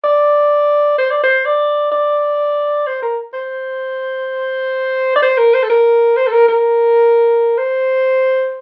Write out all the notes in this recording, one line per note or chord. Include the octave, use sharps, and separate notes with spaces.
D5
C5
D5
C5
D5
D5
C5
A#4
C5
D5
C5
A#4
C5
A4
A#4
C5
A4
A#4
A#4
C5